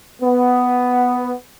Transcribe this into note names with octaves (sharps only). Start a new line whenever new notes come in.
B3